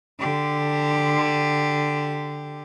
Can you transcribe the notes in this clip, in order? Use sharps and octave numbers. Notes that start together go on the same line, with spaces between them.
D3 G4